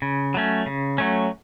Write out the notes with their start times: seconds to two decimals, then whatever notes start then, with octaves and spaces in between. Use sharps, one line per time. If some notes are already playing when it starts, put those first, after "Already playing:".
0.02 C#3
0.34 F#3 A3 C#4
0.66 C#3
0.98 F#3 A3 C#4